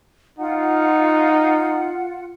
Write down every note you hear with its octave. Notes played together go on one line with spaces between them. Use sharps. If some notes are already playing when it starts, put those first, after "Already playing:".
D#4 F4 F#5